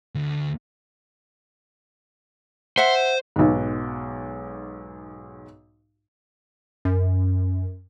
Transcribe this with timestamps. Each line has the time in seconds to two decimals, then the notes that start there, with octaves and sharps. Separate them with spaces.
0.15 D2
2.77 C5 E5 F#5
3.36 B1 G#2
6.85 F#2